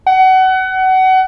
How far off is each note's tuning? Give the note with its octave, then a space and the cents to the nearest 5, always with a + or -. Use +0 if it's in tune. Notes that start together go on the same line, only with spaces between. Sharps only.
F#5 +25